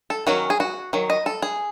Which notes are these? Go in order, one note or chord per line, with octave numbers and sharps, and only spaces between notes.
A4
D#3 F#3 C#4 F#4
G#4
F#4
D#3 F#3
D#5
A4
G#4